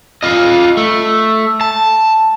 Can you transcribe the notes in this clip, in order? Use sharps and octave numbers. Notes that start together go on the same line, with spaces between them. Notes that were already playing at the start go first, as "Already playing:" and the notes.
F4 D#5
A3
A5